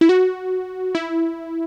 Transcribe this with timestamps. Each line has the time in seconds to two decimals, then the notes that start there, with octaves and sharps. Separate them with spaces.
0.01 E4
0.09 F#4
0.95 E4